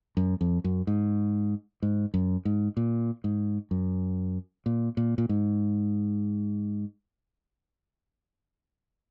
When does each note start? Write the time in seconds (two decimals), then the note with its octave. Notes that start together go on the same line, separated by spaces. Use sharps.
0.17 F#2
0.41 F2
0.64 F#2
0.87 G#2
1.82 G#2
2.14 F#2
2.45 G#2
2.77 A#2
3.24 G#2
3.71 F#2
4.66 A#2
4.97 A#2
5.18 A#2
5.29 G#2